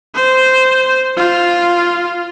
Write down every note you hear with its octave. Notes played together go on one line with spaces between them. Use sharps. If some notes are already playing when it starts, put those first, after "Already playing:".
C5
F4